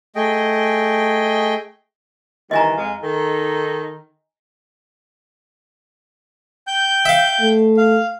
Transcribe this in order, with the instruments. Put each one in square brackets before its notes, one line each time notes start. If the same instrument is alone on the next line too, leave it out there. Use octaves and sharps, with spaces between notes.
[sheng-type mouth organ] A3 G#4 D#5 G5
[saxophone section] D#3 E3 G3 [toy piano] D#5 G#5 A#5
[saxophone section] F2 G#3 F5
D#3 D#4 A4
[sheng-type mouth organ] G5 G6
[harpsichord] E5 F5
[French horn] A3
[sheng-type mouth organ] F5